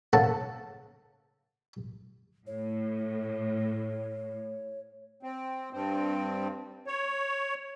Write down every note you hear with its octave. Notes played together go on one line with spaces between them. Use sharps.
C#3 A#3 A4 F#5 A5
A2 C#5
C4
G2 C4
C#5